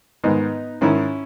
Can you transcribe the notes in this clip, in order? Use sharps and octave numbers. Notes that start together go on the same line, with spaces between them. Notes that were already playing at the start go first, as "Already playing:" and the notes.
G#2 D#3 B3 D#4
G#2 D#3 C#4 E4